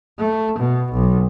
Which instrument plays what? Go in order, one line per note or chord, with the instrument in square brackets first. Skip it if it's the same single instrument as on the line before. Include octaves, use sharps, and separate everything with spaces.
[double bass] A3
B2
B1